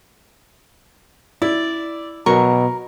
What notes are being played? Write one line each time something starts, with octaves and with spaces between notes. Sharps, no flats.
E4 D5
B2 F#3 A#4 C#6